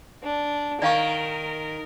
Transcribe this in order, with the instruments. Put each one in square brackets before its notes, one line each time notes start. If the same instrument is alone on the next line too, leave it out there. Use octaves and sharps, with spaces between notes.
[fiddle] D4
[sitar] D#3 [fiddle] A#4 [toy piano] D5 F5 C#6